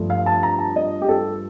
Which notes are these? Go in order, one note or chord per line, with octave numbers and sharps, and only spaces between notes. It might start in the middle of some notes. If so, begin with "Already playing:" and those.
Already playing: G2 F3 A3
F5
A5
A#5
A5
D#5
G4
A4